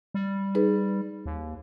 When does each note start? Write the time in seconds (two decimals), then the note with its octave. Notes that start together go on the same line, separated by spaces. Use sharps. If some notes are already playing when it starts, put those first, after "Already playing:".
0.14 G3
0.55 D#4 G#4 B4
1.26 D#2